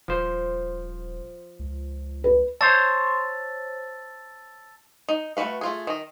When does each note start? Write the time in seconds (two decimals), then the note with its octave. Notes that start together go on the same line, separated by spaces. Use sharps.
0.08 D#1 F3 C5
1.59 C#2
2.24 B4
2.61 C5 C#5 A5 E6 A6
5.09 D#4
5.37 A3 E4 F#4 B4 F5
5.61 A3 F4 G#4
5.87 D#3 D#5